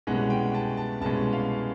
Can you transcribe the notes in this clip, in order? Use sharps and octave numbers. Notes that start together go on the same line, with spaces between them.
C2 B2 G#3 C#4 F#5
G5
A5
A5
C2 B2 G#3 C#4 A5
F5